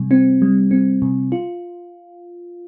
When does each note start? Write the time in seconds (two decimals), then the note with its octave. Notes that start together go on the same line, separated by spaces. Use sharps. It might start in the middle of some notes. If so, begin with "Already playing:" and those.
Already playing: C3 G3
0.11 C4
0.42 G3
0.71 C4
1.02 C3
1.32 F4